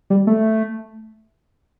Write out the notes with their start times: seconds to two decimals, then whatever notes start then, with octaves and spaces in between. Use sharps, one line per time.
0.10 G3
0.27 A3